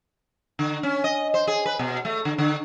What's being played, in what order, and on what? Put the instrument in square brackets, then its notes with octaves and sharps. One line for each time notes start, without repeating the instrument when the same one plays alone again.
[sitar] D3
C#4
D#5
C5
G#4
B4
B2
A3
D3
D3